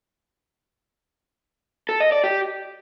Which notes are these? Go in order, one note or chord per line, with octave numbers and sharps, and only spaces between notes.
A4
D#5
D5
G4